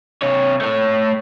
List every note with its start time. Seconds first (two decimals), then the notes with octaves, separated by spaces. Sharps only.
0.22 C3 C#5
0.61 A3 C#5